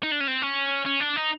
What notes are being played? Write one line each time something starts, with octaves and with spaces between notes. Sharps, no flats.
D#4
D4
C#4
C4
C#4
C#4
D4
D#4